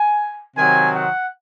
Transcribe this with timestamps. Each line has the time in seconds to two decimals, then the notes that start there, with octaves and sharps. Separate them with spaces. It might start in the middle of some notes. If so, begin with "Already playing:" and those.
Already playing: G#5
0.57 C3 D#3 F#3 C4 G#5
0.94 F#5